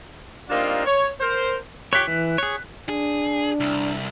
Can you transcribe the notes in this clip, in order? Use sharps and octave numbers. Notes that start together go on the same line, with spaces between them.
G3 A#3 C4 D4 D#4 F4
C#5
A#4 C5
G4 C#5 F#6 B6
E3
G#4 C#5
D4 G#4
C2